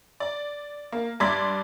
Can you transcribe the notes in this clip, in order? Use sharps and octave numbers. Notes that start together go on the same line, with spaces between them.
D5
A#3
G2 D5 C6 D6 G#6 B6